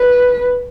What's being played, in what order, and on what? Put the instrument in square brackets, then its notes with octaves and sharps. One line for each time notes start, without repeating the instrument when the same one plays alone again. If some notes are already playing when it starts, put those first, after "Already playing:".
Already playing: [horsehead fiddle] B4